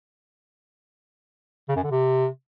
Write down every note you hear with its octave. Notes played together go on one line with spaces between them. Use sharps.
C#3
F#2
D3
C3